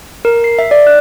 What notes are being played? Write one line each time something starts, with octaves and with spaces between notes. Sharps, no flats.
A#4
C7
E5
D5
F#6